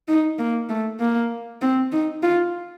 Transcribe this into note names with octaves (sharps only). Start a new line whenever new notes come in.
D#4
A#3
A3
A#3
C4
D#4
F4